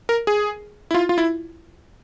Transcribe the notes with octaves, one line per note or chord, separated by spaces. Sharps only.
A#4
G#4
E4
F4
F4
E4